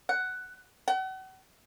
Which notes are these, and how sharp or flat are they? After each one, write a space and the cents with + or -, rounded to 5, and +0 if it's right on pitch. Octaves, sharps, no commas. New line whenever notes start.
F#5 +5
F#5 +40